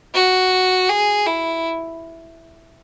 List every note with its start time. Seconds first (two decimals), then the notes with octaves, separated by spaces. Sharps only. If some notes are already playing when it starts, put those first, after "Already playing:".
0.14 F#4
0.89 G#4
1.27 E4